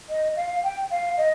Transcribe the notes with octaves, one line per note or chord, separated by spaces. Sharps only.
D#5
F5
G5
F5
D#5